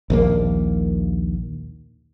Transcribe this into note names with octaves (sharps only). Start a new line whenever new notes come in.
A#1 D#2 A#3